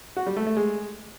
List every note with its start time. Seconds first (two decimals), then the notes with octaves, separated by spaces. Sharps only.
0.17 F#4
0.27 G3
0.37 A3
0.47 A3
0.57 G#3